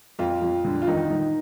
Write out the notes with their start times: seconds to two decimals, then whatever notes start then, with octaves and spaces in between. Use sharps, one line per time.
0.19 F2 F4
0.42 F2
0.65 D3
0.82 F4
0.87 D#3 D#4
1.10 D#3